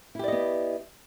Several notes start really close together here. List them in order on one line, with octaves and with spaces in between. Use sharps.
E4 G4 D5 D#5 B3